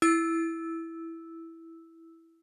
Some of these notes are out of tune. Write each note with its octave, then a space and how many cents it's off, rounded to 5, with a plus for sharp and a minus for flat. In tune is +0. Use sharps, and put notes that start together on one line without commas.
E4 +0 E6 -5